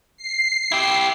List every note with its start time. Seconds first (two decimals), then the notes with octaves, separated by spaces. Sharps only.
0.17 C7
0.72 E4 G4